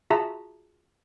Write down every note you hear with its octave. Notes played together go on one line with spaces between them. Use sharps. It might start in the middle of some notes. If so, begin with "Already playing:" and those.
F4 F#4 G#4 E5 A5 A#5